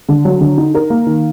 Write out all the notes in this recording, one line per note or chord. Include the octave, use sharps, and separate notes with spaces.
D3
F#3
D3
D#4
A#4
A#3
D#3